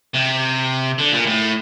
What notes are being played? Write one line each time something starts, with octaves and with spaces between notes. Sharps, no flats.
C3
D3
A#2
A2